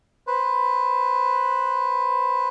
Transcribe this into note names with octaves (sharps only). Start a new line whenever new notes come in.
B4 C5